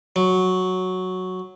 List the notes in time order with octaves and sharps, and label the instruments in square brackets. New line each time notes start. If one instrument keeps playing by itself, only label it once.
[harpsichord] F#3